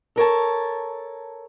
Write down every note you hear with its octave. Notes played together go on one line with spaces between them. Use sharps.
A4 A#4 C#5 A5